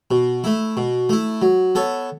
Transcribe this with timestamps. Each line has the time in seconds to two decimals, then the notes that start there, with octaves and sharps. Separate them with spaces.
0.11 B2
0.44 A3 E4
0.77 B2
1.09 A3 E4
1.42 F#3
1.75 B3 A4 C#5